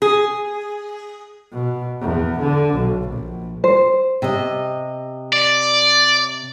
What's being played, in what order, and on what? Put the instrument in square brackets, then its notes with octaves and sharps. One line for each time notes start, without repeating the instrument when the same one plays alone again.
[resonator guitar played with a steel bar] G#4
[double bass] B2
E2
D3
B1
A#1
[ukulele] C5
[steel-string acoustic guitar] C3 D#5
[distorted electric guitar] D5